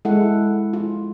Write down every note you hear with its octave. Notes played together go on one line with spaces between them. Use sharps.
G#3 E4 A4 F#5
F4